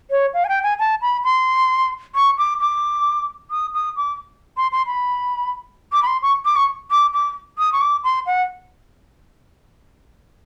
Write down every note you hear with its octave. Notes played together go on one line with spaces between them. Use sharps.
C#5
F5
G#5
G5
G#5
A5
B5
C6
C#6
D6
D6
D#6
D#6
D6
C6
C6
B5
D6
B5
C6
C#6
D6
C#6
D6
D6
D#6
C#6
D6
C6
F#5